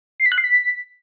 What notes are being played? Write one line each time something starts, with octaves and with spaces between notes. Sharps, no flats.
C7
B6
F#6
C7
B6